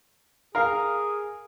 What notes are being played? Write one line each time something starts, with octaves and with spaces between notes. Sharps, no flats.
G#4 A#4 F5